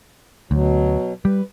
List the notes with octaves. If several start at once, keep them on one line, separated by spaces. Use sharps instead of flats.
D2 B2 F#3
G3 B4